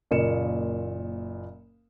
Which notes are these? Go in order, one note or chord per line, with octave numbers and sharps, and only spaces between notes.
F#1 A#2 D#5 C#7 E7